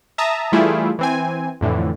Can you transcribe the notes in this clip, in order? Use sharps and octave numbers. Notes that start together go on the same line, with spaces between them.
E5 A5 A#5 D#6
E3 G3 A3 E4 F4 G#4
E3 C4 G#5
F2 A2 D3 E3